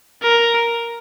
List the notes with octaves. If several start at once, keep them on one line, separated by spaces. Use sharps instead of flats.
A#4